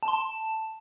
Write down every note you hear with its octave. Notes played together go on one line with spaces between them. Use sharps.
A5
C6
A5